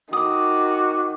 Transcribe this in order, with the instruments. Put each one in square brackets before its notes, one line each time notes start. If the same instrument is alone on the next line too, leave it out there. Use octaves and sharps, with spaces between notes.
[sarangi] D#3 [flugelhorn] F#4 [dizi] D6 [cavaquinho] D#6